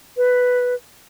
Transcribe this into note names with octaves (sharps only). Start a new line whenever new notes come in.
B4